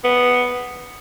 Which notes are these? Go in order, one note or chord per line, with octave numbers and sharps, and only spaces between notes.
B3